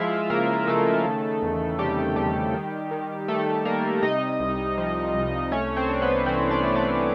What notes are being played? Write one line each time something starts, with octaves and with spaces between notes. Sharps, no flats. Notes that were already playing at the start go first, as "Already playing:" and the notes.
Already playing: F3 G#3 E4 F4 E5 F5
C#3 A#3 A#4
C#3 A3 A4
D#3
E2
C3 G3 G4
E2 G3 G4
D#3
D#3
D#3 A3 A4
G3 A#3 A#4
C3 D#4 D#5
C2
F3
C2
A3 C#4 C#5
C4 C5
D4
B3 B4
E3 C4 C5
D4 D5
A3
D4 D5